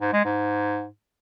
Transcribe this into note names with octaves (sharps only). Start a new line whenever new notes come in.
G#2
G#3
G#2